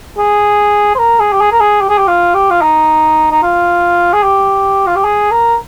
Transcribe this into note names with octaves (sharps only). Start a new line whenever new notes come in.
G#4
C5
A#4
G#4
G4
G#4
A#4
G#4
G4
G#4
G4
F4
G4
F4
D#4
D#4
F4
G#4
G4
F4
G4
G#4
A#4